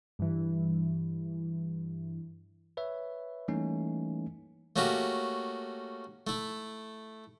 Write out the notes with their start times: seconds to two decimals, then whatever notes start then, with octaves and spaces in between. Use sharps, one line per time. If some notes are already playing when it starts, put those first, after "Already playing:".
0.19 G2 E3
2.77 B4 C#5 E5
3.48 E3 G3 A3 A#3 C#4 D#4
4.76 A3 A#3 C#4 F#4 G4
6.27 A3 E4